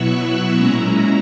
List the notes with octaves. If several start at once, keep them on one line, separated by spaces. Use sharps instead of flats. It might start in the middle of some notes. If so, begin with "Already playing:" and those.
Already playing: B2 F#3 B3 E4 C#6 E6 F#6
A#2 G#3 C#4 E4 A#5